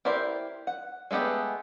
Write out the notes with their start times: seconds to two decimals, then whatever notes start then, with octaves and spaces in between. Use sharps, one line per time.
0.05 E4 G4 A#4 C5 D5
0.67 F#5
1.11 G#3 A3 B3 G4 D#5